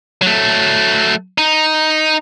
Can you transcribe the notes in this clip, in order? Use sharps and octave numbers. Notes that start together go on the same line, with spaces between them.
F#3 A3
D#4